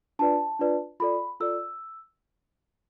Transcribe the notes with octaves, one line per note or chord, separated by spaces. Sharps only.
D4 F4 B4 D5 A5
D4 F4 B4 D5
F4 A4 D5 B5
F4 A4 D5 E6